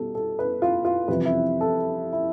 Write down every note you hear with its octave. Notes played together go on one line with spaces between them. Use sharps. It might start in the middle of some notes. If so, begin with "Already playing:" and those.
Already playing: B2 G3 A4
A4
B4
F4
F4
F2 C3 E3 G3 B4
E4
A4
E4